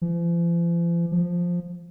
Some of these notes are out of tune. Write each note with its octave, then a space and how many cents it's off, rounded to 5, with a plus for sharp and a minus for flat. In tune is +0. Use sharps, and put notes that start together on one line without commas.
F3 -45
F3 +5